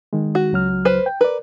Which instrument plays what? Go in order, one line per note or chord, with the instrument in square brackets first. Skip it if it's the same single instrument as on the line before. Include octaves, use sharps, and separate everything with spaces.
[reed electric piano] D#3 G#3
[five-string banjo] F#4
[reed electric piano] C#2 F#3 F6
[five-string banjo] B4 C5
[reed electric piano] G5
[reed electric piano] A#4 D5 [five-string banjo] B4